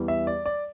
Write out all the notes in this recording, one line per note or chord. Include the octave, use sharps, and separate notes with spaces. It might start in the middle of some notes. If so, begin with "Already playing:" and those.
Already playing: E2 E3 G3
E5
D5
D5